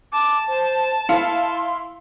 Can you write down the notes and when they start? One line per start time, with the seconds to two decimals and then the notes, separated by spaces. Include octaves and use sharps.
0.12 A5 D6
0.48 C5
1.09 E4 F5 C6 C#7